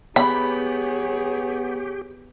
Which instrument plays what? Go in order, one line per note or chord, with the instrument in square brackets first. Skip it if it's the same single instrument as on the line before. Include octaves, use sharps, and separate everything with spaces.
[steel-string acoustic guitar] B3 [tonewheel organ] G4 [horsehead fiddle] G#4 C#5 [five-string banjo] B5